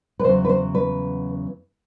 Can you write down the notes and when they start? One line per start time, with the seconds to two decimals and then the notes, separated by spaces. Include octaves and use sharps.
0.19 B4
0.24 E2 C#3 F#3 C5
0.45 B4
0.49 C5
0.75 B4